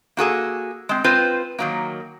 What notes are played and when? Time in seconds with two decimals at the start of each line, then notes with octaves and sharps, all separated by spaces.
0.17 A#3 F#4 G#4 A4
0.89 G#3 C4
1.04 C4 F4 B4 C5
1.59 D#3 F#3 A#3